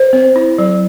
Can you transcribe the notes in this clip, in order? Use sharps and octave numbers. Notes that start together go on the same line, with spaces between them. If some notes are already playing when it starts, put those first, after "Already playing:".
Already playing: C5
C4
E4
F#3